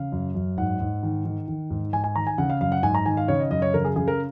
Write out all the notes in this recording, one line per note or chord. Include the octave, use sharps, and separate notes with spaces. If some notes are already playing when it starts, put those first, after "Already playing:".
Already playing: C#3 F5
F#2
F#2
G#2 F#5
G#2
D#3
D#3
D#3
G#2
G#2 G#5
G#5
D#3 A#5
G#5
C#3 F#5
F5
F#2 F5
F#5
G#2 G#5
A#5
D#3 G#5
F5
C#3 C#5
D#5
F#2 D#5
C#5
C#3 A#4
G#4
C#3 G#4
A#4